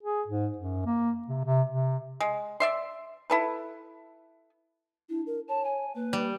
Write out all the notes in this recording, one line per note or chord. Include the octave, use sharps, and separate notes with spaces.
G#4
G#2
F#2
A#3
C3
C3
C3
G#3
D5 E5 C6
E4 A4 B4
D4 E4
A#4
C#5 A5
G#5
A#3 B4
G3